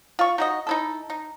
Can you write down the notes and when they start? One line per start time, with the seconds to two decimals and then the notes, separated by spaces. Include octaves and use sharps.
0.19 F4 C#6
0.38 D#4 F#4 D#5
0.67 D#4 E4 A4
1.10 D#4